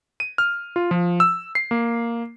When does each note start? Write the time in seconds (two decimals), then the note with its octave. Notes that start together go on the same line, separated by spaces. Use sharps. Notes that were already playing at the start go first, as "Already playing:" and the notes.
0.20 D#7
0.38 F6
0.76 F4
0.91 F3
1.20 E6
1.55 C7
1.71 A#3